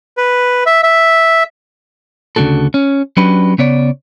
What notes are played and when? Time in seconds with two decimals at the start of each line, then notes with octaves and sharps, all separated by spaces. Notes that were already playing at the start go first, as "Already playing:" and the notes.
0.17 B4
0.66 E5
0.83 E5
2.36 D2 C#3 C4 D4 F#4 A4
2.74 C#4
3.17 F#3 C#4 D4 G4 B4
3.58 C#3 B3 C#5 D5